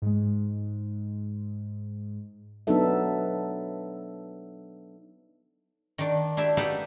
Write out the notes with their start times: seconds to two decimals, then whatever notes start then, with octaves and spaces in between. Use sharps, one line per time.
0.02 G#2 G#3
2.67 F#3 B3 D4 D#4 A4 E5
5.98 D#3 D4
6.37 D4 E4 G4 E5
6.57 D#4 G4 A4 B4 F5 F#5